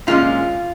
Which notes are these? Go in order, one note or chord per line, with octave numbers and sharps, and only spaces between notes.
A#2 G#3 C#4 F4